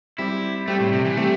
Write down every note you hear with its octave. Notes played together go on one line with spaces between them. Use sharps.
G3 C4 E4 G4
G3 A3 C4 G4
A2
C3
E3
G3 A3 C4 G4